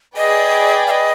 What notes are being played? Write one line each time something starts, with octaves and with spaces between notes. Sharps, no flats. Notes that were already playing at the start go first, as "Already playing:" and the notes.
G#4 B4 D5 D#5 G5
F5
D#5